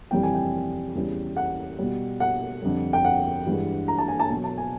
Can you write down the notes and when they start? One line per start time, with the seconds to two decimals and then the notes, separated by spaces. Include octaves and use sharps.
0.11 F2 C3 E3 G3 G5
0.23 G#5
0.34 G5
0.95 E2 C#3 E3 G3
1.37 F#5
1.79 B2 G3
2.20 F#5
2.62 F2 D3 G3
2.93 G5
3.05 F#5
3.47 G2 E3 G#3
3.88 A#5
3.98 A5
4.08 G#5
4.20 A5
4.30 B2 F#3
4.44 A5
4.58 G#5